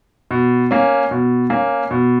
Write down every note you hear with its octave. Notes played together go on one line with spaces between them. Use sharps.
B2
A#3 C#4
B2
A#3 C#4
B2